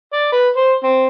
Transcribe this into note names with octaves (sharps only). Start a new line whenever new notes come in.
D5
B4
C5
C4